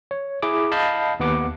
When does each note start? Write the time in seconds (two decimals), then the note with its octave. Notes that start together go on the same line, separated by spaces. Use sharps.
0.11 C#5
0.42 E4 G#4 D6
0.71 D#5 F5 A5 B5 G6 C7
1.20 D#2 B3 B4 F#5 D6